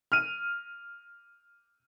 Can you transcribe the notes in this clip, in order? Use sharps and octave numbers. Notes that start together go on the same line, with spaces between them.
F6 D#7